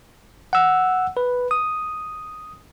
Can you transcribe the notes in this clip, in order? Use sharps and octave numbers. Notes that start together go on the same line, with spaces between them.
F#5 E6
B4
D#6